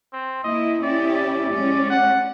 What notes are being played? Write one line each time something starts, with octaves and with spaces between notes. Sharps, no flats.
C4
A#3 E4 D#5
C#4 E4 G4 D5
D5
G#3 C#4
F#5